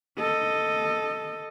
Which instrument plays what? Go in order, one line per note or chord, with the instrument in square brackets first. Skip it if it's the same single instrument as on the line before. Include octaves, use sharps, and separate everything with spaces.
[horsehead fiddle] A4 D#5